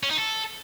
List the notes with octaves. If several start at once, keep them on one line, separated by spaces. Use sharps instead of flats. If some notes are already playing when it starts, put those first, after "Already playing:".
C#4
D#4
A4